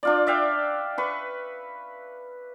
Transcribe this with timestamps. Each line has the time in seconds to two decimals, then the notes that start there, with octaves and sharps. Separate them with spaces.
0.03 D4 F4 D5
0.27 D5 E5 F5 G5
0.98 B4 C#6